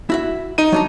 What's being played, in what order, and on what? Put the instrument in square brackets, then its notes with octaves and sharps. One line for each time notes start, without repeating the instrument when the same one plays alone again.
[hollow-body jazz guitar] E4 F#4 E5
[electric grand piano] D#4 D#7
[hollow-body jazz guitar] F#3 D4 A#5